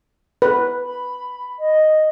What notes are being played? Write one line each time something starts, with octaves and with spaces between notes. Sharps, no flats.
B4
B5
D#5